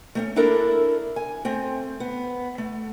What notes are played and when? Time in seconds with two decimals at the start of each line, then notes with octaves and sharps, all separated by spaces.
0.15 A3 A#3 C#4
0.36 A#3 D4 E4 A4 A#4 D5
1.16 G#5
1.45 A3 C4
2.00 B3
2.58 A3